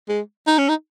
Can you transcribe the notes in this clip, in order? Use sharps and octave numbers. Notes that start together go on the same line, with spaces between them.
G#3
D#4
C#4
D#4